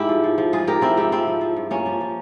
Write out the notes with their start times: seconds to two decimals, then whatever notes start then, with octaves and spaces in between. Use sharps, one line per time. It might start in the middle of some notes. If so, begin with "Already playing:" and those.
Already playing: G#2 E4 G4
0.09 F3
0.24 F3
0.38 F3
0.53 G#2 F4 G#4
0.67 G#2 G4 A#4
0.81 F3 C4 E4
0.97 G#2 E4 G4
1.12 F3 C4 E4
1.27 F3
1.41 F3
1.56 G2
1.71 G2 A#3 C#4
1.86 F3
2.01 F3